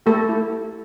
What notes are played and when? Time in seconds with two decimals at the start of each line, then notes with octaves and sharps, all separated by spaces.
0.06 A3 G4 A4
0.29 E4